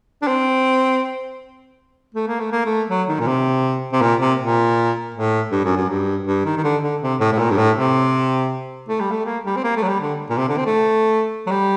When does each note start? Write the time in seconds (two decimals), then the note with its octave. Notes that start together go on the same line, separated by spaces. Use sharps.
0.22 D4
0.28 C4
2.15 A3
2.28 A#3
2.40 A3
2.52 A#3
2.65 A3
2.89 F#3
3.08 D#3
3.20 A#2
3.27 C3
3.93 C3
4.02 A#2
4.20 C3
4.39 A#2
5.15 A2
5.52 G2
5.65 F#2
5.77 F#2
5.89 G2
6.27 G2
6.45 D#3
6.57 D#3
6.64 D3
6.83 D3
7.02 C3
7.20 A2
7.32 A2
7.39 A#2
7.51 G2
7.58 A2
7.76 C3
8.89 A3
9.00 G3
9.11 A3
9.26 A#3
9.45 G3
9.56 C4
9.64 A#3
9.77 A3
9.83 F#3
9.88 G3
10.01 D3
10.30 A#2
10.38 C3
10.49 D3
10.58 C4
10.66 A3
11.47 F#3
11.51 G3